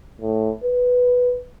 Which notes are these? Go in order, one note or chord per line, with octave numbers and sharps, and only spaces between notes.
A2
B4